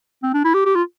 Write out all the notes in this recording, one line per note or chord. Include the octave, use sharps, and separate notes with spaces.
C4
D4
E4
G4
G4
F4